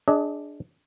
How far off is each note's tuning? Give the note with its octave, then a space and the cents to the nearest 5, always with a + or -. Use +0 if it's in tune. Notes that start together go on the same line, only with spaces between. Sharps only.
D4 +0 G#4 +10 D#5 +30